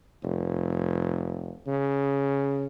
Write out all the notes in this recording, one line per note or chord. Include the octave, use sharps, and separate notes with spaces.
F1
C#3